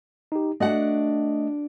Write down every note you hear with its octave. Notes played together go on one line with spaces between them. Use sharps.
D#4 G4
A3 D4 F#4 D#5 F#5